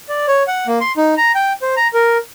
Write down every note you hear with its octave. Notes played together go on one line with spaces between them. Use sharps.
D5
C#5
F#5
A#3
C6
D#4
A#5
G5
C5
A#5
A#4